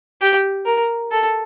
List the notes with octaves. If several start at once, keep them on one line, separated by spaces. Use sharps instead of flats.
G4
A#4
A4